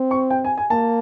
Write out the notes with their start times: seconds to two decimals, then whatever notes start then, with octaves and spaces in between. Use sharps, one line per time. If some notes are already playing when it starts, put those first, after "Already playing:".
Already playing: C4
0.11 C#6
0.30 G5
0.44 G#5
0.58 G#5
0.70 A#3 A5